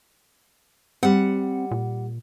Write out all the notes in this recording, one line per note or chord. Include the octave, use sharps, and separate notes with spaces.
G3 C4 F#5
A#2